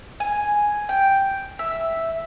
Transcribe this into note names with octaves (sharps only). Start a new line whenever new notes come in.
G#5
G5
E5